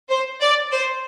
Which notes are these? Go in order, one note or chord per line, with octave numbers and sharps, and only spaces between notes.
C5
D5
C5